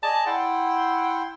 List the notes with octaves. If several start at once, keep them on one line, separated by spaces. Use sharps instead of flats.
G#4 D5 D#5 A5
E4 F#5 G5 C6